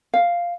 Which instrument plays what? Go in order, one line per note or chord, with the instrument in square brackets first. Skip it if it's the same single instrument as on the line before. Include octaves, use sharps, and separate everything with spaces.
[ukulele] F5